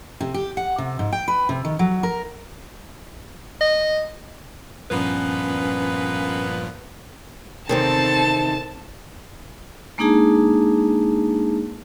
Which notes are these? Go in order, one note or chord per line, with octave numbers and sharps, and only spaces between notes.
C3
G4
F#5
C3
G#2
G5
B4
C3
D#3
F#3
A#4
D#5
G2 A#2 F3 A#3 B3 C#4 B4
E2 C3 D#3 C4 A4 A5
G#3 A#3 D4 D#4 G#4 A5